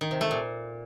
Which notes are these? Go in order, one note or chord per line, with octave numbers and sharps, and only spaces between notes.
D#3
C3
A3
A#2